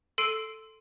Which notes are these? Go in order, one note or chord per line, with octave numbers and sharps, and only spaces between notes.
A4 C6 E6 C7 D7 D#7